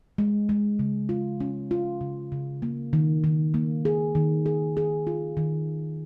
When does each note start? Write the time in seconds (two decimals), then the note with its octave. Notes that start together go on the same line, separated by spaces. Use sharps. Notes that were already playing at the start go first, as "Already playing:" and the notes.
0.18 G#3
0.49 G#3
0.79 C#3
1.09 F4
1.40 C#4
1.71 F4
2.01 C#3
2.32 C#3
2.62 A#3
2.93 D#3
3.24 D#3
3.54 A#3
3.85 G#4
4.15 D#3
4.46 G#4
4.77 G#4
5.07 F4
5.37 D#3